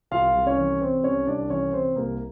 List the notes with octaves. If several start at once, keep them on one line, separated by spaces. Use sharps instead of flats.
C2 F4 F5
C2
C#4 C#5
E3
C3 C4 C5
C2 C#4 C#5
C2 D4 D5
E3 C#4 C#5
C3 C4 C5
C2 A#3 A#4